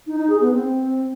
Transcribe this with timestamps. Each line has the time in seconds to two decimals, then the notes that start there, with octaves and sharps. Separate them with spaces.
0.07 D#4
0.18 D#4
0.30 G#4
0.41 B3
0.52 C4